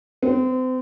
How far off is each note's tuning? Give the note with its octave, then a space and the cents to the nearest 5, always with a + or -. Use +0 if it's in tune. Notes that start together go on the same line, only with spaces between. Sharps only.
C4 -35